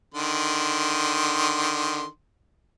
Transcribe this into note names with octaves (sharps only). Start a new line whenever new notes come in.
D3 D#3 C6